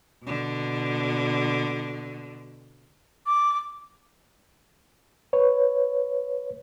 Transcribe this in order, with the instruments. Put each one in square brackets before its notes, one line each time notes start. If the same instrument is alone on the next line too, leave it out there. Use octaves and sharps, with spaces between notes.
[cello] B2 D3
[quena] D6
[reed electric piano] B4 C#5